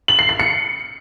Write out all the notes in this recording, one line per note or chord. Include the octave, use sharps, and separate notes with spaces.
F#7
C7
C7
C#7